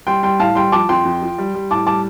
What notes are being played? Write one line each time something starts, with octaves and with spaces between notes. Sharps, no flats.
G3 G5 C6
G3 G5 C6
A2 F5 A5
G3 G5 C6
F3 A5 D6
F2 G5 C6
F2
F3
G3
G3
A2 A5 D6
G3 A5 D6